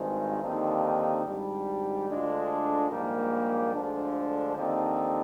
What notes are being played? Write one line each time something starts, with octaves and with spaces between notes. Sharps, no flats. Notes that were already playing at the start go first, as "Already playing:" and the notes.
Already playing: G#1 G2 D#3 G#3 C4
D#2 D3 F3 C4 D#4
G#1 G#2 G3 D4
D2 D3 G#3 D4 F4
A#1 G#2 G3 A#3
D2 D3 F3 G#3 D4
D#2 D3 F3 C4 D#4